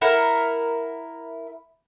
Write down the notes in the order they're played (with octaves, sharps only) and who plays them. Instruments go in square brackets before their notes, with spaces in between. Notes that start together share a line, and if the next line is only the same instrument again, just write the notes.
[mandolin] E4 A#4 F#5